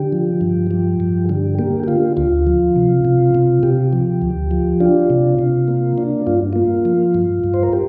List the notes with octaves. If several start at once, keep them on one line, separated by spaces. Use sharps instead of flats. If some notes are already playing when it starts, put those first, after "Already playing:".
Already playing: D3 G4
F3
G2
F3
G2
D3 G4
A#3 G4
G4
D3 F4
D2 F4
F3
C3
C3
C3
C3 G4
F3
D2
F3
D4 F4
C3
C3
A#3
D4
G2 F4
A#3 F4
F3
G2
G2
C5
A#4
G4